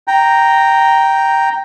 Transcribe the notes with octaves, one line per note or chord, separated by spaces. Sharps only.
G5 A#5